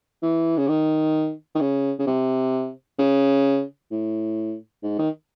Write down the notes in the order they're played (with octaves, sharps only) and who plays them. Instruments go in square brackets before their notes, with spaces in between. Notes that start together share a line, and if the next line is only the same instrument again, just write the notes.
[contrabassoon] E3
C#3
D#3
D#3
C#3
C#3
C3
C#3
A2
G#2
D#3